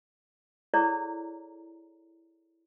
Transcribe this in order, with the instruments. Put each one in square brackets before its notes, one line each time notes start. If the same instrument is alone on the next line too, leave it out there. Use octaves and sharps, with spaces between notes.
[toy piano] E4 G#4 A4 C#5 D5 A#5